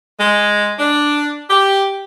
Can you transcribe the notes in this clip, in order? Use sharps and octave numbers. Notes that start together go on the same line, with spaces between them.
G#3
D4
G4